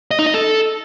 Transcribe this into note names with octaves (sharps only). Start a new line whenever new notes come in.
D#5
D#4
D#5
A4